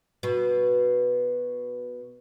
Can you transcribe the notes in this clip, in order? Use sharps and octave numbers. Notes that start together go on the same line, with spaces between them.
B2